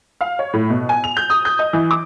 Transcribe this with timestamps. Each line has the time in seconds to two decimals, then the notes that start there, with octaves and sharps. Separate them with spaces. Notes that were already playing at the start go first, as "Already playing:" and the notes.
0.21 F5
0.39 C#5
0.53 A2
0.70 B2
0.89 G#5
1.04 F7
1.17 G6
1.30 D#6
1.45 G6
1.59 D#5
1.73 E3
1.91 D6